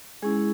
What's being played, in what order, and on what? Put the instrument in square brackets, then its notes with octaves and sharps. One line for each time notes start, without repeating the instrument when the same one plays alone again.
[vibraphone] G#3 C#4 E4 G#4